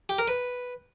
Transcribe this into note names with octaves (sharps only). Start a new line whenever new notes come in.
G4
A#4
B4